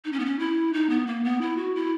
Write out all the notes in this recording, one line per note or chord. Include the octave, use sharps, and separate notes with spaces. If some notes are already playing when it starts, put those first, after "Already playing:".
D#4
C#4
B3
C#4
E4
D#4
B3
A#3
B3
E4
F#4
E4